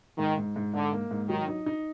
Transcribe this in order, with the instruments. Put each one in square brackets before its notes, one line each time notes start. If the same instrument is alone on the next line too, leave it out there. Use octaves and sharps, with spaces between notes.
[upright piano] G#2 [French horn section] D#3
[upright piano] G#2
G#2
[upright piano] G#2 [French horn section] D3
[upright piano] A#3
G#2
[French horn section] D#3 [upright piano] F#3
[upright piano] D#4
D#4